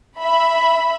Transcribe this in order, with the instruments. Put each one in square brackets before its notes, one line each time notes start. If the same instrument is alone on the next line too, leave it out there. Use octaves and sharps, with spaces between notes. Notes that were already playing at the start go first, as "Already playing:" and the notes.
[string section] E5 B5